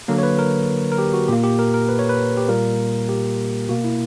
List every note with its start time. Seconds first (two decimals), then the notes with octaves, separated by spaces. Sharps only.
0.08 D3 F#3 A#3 A#4
0.18 C#5
0.23 B4
0.39 A#4
0.92 A#4
0.98 G4
1.13 F#4
1.28 A#2 A#3 G4
1.44 G4
1.59 A#4
1.74 A#4
1.89 B4
1.99 C#5
2.09 B4
2.37 G4
2.49 A#2 G3 A#3 A#4
3.09 G4
3.68 B2 A#3 F#4
3.84 E4